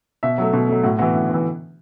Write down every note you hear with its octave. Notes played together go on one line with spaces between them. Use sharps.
B2 E5
F#3 A3
B2
F#3 A3
A2 F#4
E3 B3 F#4
A2
E3 B3